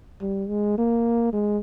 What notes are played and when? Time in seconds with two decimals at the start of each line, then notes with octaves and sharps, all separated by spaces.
0.21 G3
0.48 G#3
0.78 A#3
1.33 G#3